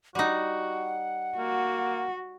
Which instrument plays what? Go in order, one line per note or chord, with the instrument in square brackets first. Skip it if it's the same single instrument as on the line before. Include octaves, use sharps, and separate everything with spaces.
[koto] G3 D#4 [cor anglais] F#4 [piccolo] F#5
[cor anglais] A#3 [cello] F#4